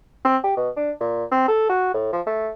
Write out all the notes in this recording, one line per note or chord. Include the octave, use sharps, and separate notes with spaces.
C4
G4
B2
D4
A#2
C4
A4
F#4
A2
F3
A3